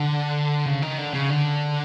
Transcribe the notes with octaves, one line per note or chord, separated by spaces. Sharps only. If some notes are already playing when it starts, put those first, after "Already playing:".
Already playing: D3
C#3
D#3
D3
C#3
D3